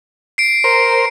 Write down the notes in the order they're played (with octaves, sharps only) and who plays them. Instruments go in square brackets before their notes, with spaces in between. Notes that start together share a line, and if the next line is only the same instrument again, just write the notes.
[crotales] C7 D7
[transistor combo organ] A#4 C5